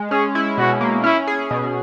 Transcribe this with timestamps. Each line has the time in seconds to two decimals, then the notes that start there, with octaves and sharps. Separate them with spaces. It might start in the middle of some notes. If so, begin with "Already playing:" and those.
Already playing: G#3
0.11 C#4 G#4
0.35 E4
0.58 B2 F#4
0.81 A#3
1.04 C#4 E4
1.27 G#4
1.51 B2